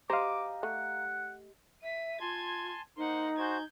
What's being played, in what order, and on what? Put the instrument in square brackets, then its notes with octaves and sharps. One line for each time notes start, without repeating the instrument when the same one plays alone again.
[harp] G4 D#5 [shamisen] C5 [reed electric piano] F5 A#5 [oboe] D6
[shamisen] A3 [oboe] F#5
[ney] E5 [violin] B6 D#7
[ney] F4 [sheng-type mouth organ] G#5 A5 C6 [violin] G#6
[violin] A#3 F#5 [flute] D#4 [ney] C5 [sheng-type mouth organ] C6
[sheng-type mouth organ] F#4 C5 [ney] G#5 [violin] G6 G#6